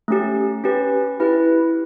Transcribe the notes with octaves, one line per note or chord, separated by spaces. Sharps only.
A3 C#4 G4
C#4 G4 B4
E4 G4 B4